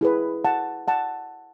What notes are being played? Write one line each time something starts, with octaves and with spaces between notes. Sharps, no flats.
E4 G#4 B4
F#5 A5
F#5 A5